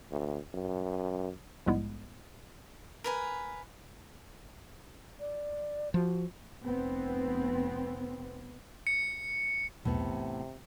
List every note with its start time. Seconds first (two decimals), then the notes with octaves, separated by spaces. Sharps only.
0.11 D2
0.54 F#2
1.66 A#1 G#2 G3 G#3 B3 E4
3.04 A#4 B4 G#5
5.20 D5
5.94 F3 F#4
6.65 F1 B3 C4
8.87 C#7
9.85 B1 E2 A2 C3 B3